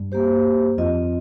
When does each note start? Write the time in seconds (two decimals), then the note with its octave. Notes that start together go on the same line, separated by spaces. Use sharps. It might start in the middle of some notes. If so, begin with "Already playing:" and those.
Already playing: G2
0.12 A#3 G4 C5
0.78 F2 C4 F4 D#5